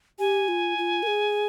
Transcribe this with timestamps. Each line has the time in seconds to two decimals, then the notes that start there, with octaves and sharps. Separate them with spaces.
0.19 G4 G#5
0.48 F4
0.78 F4
1.03 A#4
1.07 G#4